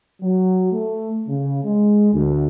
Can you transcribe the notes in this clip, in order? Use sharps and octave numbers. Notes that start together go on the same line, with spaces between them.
F#3
A3
C#3
G#3
D2